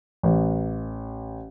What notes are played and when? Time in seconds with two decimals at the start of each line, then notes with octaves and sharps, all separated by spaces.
0.23 A1